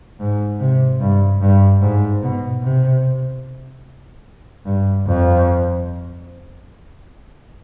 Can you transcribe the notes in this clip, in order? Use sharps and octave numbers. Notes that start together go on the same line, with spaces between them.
G#2
C3
G2
G2
G#2
B2
C3
G2
F2